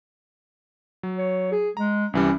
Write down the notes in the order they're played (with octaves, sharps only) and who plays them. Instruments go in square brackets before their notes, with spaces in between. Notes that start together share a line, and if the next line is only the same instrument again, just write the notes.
[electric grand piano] F#3
[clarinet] C#5
G#4
[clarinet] G#3 [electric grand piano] A#5
[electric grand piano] C2 E3 G3 [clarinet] C#4